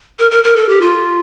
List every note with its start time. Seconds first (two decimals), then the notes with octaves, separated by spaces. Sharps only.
0.19 A#4
0.31 A#4
0.44 A#4
0.56 A4
0.69 G4
0.81 F4